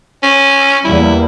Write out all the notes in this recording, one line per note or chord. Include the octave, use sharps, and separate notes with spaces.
C#4
E2 G3 A#3 E4